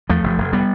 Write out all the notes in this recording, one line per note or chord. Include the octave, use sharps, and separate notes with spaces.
E2 F3 A3
F1
F1
G3 B3